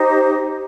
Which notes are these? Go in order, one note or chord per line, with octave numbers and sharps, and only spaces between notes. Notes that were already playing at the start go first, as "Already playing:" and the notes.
Already playing: D#4 G4 C5